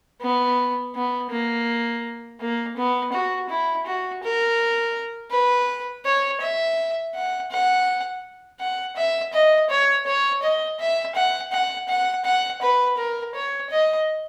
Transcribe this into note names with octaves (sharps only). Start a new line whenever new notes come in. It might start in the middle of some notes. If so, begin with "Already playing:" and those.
B3
B3
A#3
A#3
B3
F#4
E4
F#4
A#4
B4
C#5
E5
F#5
F#5
F#5
E5
D#5
C#5
C#5
D#5
E5
F#5
F#5
F#5
F#5
B4
A#4
C#5
D#5